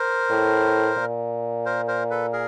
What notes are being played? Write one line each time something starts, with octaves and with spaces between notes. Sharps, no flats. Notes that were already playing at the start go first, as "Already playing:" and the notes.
Already playing: A#4 C5
A2
A#2
A#4 C5
A#4 C5
A4 B4
G#4 A#4